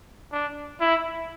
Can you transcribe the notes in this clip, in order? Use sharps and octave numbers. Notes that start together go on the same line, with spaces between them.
D4
E4